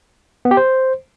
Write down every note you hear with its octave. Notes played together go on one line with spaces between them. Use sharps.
B3
G4
C5